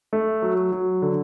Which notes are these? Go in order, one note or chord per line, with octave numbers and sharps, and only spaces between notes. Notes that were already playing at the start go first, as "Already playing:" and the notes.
A3
F#3
F#3
D3